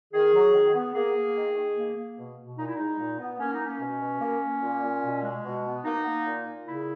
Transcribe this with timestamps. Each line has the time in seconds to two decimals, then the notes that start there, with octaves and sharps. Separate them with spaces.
0.13 D#3 G#4
0.34 F#3
0.54 D#3
0.74 B3
0.95 A#3 G#4
1.16 A#3
1.36 D#3
1.56 D#3
1.76 A#3
1.97 A#3
2.18 B2
2.38 B2
2.58 A#2 D#4
2.67 E4
2.75 G#3 D#4
3.00 A#2
3.20 B3
3.39 A#3 C#4
3.53 D#4
3.60 A#3
3.65 C#4
3.81 B2
4.01 B2
4.21 A#3
4.43 A#3
4.62 A#2
4.83 A#2
5.03 B2
5.23 G#3
5.45 B2
5.65 B3
5.85 A#3 D#4
6.05 A#3
6.26 A#2
6.47 A#2
6.67 C#3 E4